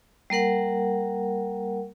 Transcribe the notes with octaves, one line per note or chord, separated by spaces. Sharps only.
G3 A#3 A#4 F#5